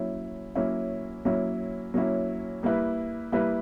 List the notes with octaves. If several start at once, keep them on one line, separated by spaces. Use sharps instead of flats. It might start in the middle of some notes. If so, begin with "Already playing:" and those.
Already playing: F#3 A#3 C#4 E4
F#3 A#3 C#4 E4
F#3 A#3 C#4 E4
F#3 A#3 C#4 E4
G3 A#3 E4 B4
G3 A#3 E4 B4